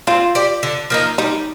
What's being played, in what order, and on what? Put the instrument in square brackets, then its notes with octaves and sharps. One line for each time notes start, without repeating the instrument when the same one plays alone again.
[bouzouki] C4 [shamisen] F4
[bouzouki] G4 D5
D3
F3 A#3 D#4
[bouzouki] G3 [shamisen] D#4